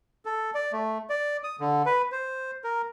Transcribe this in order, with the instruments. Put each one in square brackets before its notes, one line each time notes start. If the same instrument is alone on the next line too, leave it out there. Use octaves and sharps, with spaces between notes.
[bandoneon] A4
D5
A3
D5
D#6
D3
B4
C5
A#4